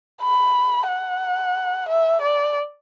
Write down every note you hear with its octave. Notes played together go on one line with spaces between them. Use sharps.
B5
F#5
E5
D5